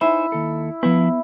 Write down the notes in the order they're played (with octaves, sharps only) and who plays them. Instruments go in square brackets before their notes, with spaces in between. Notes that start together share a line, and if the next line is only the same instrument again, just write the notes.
[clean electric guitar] D#4 C5 G#5 [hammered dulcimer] E4
[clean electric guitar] D#2 A4
[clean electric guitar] F3 E4 B4 [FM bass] B3